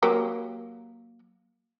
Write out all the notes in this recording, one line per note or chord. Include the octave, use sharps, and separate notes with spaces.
F#3 A#3 G4